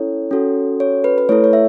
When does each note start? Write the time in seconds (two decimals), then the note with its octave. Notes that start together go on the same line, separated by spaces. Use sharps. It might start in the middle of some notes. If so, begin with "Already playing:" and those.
Already playing: C#4 E4 A4 C#5
0.31 C#4 F#4 A4
0.80 C#5
1.04 B4
1.18 B4
1.29 A3 E4 A4 C#5
1.44 C#5
1.53 E5